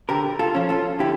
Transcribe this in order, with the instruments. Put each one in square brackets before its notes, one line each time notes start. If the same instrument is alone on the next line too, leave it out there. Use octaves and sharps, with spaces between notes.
[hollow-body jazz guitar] D3 G4 A#4
F4 A4
F3 C#4
F4 A4
D3 E4 G4